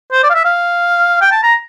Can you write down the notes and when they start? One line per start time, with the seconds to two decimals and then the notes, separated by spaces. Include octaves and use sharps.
0.12 C5
0.24 D5
0.30 F5
0.34 E5
0.45 F5
1.21 G5
1.32 A5
1.43 A#5